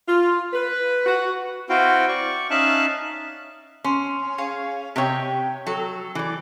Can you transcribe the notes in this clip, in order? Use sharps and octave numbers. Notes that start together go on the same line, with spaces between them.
F4
B4
F#4
C4 E4 F#4 F5 G5
D5 C#6
C#4 D#4 E5 F5 A5 F#6
C#4 C6
G#4 C#5 F5
C3 G4 C#5 D#5 G5
F#3 A4
E3 D5